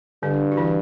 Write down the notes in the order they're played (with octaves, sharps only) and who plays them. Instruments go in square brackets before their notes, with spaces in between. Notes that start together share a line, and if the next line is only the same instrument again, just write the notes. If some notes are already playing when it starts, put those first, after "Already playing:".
[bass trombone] G2 [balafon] D3 D4
[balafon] F#4
E3 E4